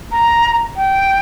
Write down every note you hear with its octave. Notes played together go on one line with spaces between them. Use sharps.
A#5
G5